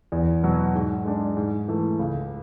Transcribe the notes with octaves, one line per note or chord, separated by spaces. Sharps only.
E2
B2 F#3
G#2
G#3 D4
G#2
E3 A3
C#2